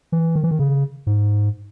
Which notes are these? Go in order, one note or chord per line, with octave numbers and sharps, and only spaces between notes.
E3
D#3
E3
D#3
C#3
G#2